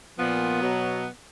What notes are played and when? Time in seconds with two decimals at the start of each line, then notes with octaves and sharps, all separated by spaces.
0.18 A#2 F3 B3
0.61 B2 F#3